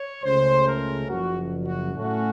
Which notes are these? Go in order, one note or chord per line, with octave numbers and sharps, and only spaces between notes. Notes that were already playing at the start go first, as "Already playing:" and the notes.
Already playing: C#5
C#2 C#3 A3 C#4 C5
A#4
F#1 F#2 F3 F#4
F#4
A2 A3 C#4 F#4